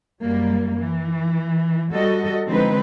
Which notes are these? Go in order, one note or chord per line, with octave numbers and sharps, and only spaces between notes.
F#2 G3 A#3
E3
G3 F#4 A4 D#5
D3 F3 G#3 C4 D#4 B4